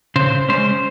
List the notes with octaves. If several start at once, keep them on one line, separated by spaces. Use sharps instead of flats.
C#3 C5
G#3 C#4 C5